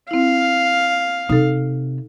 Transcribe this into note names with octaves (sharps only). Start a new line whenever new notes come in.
C4 E4 F5
C3 D#4 A4